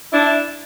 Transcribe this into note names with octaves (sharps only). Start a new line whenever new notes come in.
D4 E4